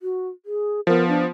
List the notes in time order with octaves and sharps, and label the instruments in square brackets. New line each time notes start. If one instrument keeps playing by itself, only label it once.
[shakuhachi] F#4
G#4
[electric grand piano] F3 B3 [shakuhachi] A#4
[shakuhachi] D4